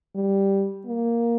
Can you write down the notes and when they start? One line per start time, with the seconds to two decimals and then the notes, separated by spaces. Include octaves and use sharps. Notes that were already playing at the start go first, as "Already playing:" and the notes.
0.15 G3
0.86 A#3